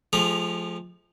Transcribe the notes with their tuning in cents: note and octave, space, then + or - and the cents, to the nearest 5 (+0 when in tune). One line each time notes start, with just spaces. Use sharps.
F3 +0 A3 -45 G#4 -45